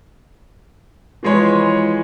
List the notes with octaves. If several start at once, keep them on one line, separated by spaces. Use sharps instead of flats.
E3 F3 G#3 B4 C#5 C6